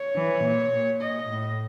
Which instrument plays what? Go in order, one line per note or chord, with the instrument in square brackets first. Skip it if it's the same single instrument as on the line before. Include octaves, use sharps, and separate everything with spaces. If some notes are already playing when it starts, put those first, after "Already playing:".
Already playing: [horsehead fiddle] C#5
[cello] E3
A#2
A#2
[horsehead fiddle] D#5
[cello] A2